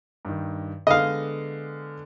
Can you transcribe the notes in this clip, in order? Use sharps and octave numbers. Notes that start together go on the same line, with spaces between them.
G2 D#3
D3 G#3 B3 D#5 F5